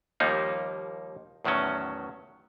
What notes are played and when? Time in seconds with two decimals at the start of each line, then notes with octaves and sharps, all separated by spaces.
0.20 D#2 F3 G3 A#3 D#4
1.45 E2 A2 D#3 F#3 C#4